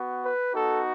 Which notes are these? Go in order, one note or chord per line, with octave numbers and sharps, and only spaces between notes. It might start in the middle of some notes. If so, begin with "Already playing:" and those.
Already playing: B3 F#4
B4
B3 D#4 F#4 A4